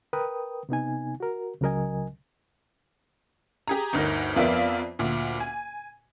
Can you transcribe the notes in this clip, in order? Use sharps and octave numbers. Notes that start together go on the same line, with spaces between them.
A#4 B4 G5 D#6
C3 B3 D#4 G#5
F#4 A#4
C#2 C#3 F#3 A#4 D#5 G#5
G4 G#4 A#5
G1 D2 D#4 A#4
F2 B3 F4 A#4 D5 E5
D2 A#2
G#5